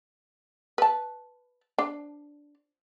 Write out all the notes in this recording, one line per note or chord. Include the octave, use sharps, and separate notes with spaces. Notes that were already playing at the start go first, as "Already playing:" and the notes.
B4 A5
D4